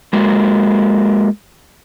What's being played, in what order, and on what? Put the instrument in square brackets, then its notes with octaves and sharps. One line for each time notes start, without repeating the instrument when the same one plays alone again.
[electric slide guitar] G#3 A#3 F#4